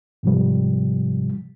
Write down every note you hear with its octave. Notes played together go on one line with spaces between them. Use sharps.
G#2 C3 F3 G3